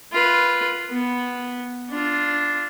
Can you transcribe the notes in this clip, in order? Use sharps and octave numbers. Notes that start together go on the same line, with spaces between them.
F4 B4
B3
D4 F4